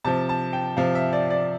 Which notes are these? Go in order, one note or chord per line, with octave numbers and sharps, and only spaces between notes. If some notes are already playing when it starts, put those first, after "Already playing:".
C3 F3 A5
A5
G5
C3 F3 F5
E5
D5
D5